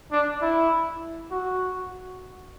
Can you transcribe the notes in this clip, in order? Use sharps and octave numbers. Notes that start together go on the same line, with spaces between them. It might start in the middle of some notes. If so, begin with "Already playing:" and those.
D4
E4
F#4